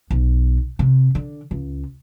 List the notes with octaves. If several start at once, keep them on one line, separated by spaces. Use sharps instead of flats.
B1
C3
D3
C#2